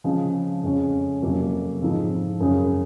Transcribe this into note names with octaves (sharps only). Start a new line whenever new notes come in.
C#3 F3 G#3 C4
F2 C#3 G#3 C#4
F2 C3 F#3 A#3 C#4
G#2 F3 G#3 C4 D#4
F#2 C#3 F#3 C#4 G#4